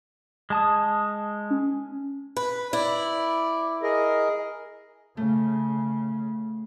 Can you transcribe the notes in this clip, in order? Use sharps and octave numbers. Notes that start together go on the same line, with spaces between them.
G#3 A5 D#6
C#4
B4
E4 D5
G#4 A#4 D#5
C#3 A3